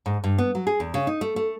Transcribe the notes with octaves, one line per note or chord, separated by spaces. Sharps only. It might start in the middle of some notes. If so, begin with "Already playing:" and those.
G#2
G2
B3
F#3
G#4
E2
C#3
D#4
A3
A3